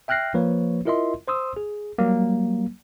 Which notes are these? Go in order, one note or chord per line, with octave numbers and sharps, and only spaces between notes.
E5 G5 F6 F#6 A#6 C7
F3 A#3 B4 C#5
E4 F4 A#4 D#5 E5 C6
C5 C6 D#6 E6
G#4
F#3 G3 A#3